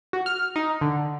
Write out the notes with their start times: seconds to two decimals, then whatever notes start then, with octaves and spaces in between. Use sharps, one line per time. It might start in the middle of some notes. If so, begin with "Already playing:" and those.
0.13 F#4
0.26 F6
0.56 D#4
0.81 D3